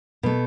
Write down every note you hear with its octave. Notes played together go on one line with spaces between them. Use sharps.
B2 A3